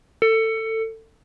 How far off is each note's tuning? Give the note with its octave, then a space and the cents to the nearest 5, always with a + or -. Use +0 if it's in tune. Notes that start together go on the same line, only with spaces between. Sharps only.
A4 +20